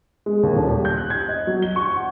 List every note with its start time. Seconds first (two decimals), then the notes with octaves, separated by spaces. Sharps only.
0.26 G#3
0.43 D#2
0.56 D#1
0.70 G4
0.85 G6
0.97 F#6
1.10 G#6
1.29 D#5
1.47 F#3
1.62 G7
1.76 C#6
1.96 F#5